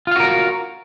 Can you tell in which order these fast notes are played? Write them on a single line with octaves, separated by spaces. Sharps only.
F4 F5 F#4 A#4